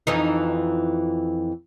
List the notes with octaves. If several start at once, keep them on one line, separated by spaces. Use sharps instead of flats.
F2 E3 D#4